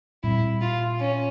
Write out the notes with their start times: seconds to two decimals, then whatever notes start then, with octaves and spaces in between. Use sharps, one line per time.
0.23 A#2 G3 C4 E4
0.62 F4
1.00 C#4